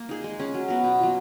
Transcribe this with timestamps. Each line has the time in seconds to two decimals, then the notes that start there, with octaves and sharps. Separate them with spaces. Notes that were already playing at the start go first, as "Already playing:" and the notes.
Already playing: A#3
0.09 D#4 G#4
0.24 G#3
0.40 C#4 G#4
0.54 F#3
0.68 B3 F#4 A#4
0.84 B2
0.99 F#3 A#3 F4